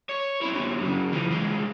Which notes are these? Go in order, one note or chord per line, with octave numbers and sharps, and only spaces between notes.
C#5
C4 E4
F#2 D3
F#2 C#3
E3 F3
C2 G#3